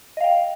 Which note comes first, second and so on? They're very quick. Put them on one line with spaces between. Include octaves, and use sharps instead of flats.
D#5 F5 G5